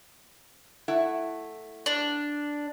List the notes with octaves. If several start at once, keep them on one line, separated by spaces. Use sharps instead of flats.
A3 E4 F#5
D4